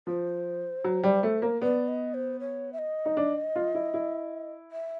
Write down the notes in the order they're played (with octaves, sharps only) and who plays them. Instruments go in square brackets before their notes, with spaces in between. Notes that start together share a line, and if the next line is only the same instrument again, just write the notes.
[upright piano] F3 [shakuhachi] C5
[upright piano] F#3
G3
A3
A#3
[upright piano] B3 [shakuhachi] D5
[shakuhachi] D#5
C5
C#5
E5
D#5
[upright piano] D#4
D4
F4
E4
E4
[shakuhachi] E5